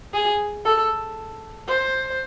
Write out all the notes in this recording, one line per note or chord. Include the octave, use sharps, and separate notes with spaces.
G#4
A4
C5